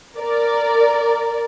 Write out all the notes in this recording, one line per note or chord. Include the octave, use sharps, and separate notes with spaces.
A#4 D5